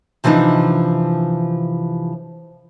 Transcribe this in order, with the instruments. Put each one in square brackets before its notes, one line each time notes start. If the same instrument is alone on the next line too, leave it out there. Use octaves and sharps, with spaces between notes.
[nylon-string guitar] C3 E3 F3 D4 D#4